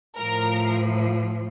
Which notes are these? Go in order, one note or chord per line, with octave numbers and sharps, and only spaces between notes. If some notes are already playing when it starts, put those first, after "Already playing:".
A2 F3 A#4